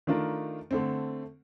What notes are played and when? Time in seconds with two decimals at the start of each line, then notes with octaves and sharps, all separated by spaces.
0.07 D#3 A3 D4 F4 A#4
0.71 D3 A3 C4